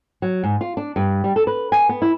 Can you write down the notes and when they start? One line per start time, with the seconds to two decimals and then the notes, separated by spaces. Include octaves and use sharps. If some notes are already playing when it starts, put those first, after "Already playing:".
0.22 F#3
0.44 G#2
0.61 F4
0.77 D4
0.96 G2
1.24 G3
1.36 A4
1.47 B4
1.72 G#5
1.89 B3
2.02 E4